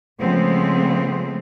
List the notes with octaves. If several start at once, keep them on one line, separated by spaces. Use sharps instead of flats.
C#3 F3 G#3 A3 B3 C4